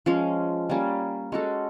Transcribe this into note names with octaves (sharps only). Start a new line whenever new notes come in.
F3 G#3 C#4
G3 A#3 C#4
G#3 C#4 F#4 A4